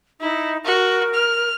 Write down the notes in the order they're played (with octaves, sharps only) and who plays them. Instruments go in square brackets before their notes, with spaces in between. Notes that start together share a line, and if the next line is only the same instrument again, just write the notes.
[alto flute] D#4 [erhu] E4
[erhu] F#4 [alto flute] A#4
[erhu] F6